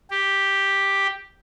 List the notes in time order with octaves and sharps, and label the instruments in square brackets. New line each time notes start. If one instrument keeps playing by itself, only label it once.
[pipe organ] G4